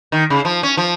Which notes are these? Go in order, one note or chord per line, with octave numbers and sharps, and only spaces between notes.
D#3
C#3
F3
C#4
F3